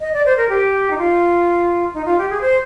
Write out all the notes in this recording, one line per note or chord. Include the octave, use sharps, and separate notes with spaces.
D#5
D5
C5
A#4
G4
D#4
F4
D#4
F4
G4
G#4
C5